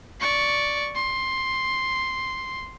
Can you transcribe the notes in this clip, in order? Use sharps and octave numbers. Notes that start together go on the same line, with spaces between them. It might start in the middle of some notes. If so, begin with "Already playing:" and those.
D5 C#6
C6